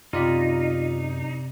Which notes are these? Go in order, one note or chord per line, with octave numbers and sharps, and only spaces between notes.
F#2 C3 D#4 F4 D5 B5